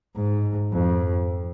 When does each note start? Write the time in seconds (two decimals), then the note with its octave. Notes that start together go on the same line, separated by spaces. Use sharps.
0.15 G#2
0.72 F2